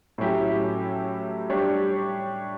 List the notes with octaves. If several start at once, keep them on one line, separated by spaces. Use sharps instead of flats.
A2 F#3 C#4 E4 G4
G3 D4 G4 C#5